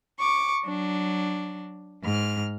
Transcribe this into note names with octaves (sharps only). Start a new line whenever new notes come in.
C#6 D6
F#3 D4
G#2 F6